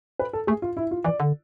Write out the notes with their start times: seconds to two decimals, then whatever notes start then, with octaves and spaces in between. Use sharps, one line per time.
0.19 B4
0.33 A4
0.47 A3 G#4
0.62 F4
0.77 E4
0.91 F4
1.04 E3 D5
1.20 D3